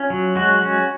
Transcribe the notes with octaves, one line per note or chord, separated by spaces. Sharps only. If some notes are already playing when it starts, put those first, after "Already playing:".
Already playing: C#4 F4
F#3
G#3 F#4
C#4